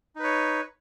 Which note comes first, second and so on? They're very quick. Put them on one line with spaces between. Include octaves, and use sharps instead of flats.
D#4 B4 C#5